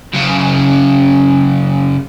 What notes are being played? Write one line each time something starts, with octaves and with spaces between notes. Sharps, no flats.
F#2 C#3